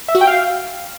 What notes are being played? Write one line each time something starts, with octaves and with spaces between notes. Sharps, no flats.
E5
F#4
G5
F5